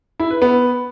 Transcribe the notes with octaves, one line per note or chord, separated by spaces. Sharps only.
E4
B4
B3